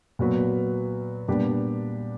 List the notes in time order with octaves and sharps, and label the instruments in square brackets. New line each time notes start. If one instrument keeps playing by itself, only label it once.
[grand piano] A#2 F#3 B3 F#4 B4
A#2 G3 B3 D4 G4